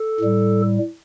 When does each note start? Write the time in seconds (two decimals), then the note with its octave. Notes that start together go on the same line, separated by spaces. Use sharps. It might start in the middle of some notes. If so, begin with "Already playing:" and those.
Already playing: A4
0.20 A2 G3